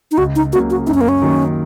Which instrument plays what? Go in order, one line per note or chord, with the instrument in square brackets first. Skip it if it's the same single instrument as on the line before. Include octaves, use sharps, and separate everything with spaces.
[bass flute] D#4
[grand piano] C#2 [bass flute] F#4
[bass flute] D#4
[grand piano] C#3 F#3 A#3 [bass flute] F#4
[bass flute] F#4
[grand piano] F#2 [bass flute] D#4
[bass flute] C#4
A#3
C#4
[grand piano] D#3 F#3 A#3